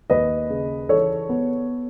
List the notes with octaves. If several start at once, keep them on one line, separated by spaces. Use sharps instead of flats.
D#2 B4 D#5
C#3
E3 A4 C#5
B3